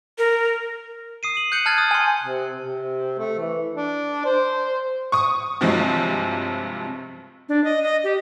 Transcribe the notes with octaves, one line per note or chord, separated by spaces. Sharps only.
A#4
D#6 C7 D#7
D#7 F#7
F#6 G6 C#7 D#7 F#7
A5 F6 F#6 G#6 A6
D#6
G#5 C6
C3
C3
A3
E3
D4
C5
C#6 D#6
G2 C3 F3 F#3 G#3
D4
D#5
D#5
G4